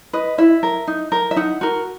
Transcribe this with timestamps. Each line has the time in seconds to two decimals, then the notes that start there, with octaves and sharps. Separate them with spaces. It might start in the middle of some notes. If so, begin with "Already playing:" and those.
0.13 B4 D#5
0.38 E4 E5
0.63 A#4
0.87 D#4
1.12 A#4
1.31 E5
1.36 D#4 F#5
1.61 F#4 A#4